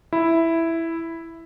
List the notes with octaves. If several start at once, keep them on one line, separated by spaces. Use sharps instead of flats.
E4